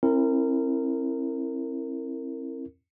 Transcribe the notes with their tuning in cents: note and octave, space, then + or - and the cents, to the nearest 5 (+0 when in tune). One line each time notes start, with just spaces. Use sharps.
C4 +40 E4 +0 A#4 -25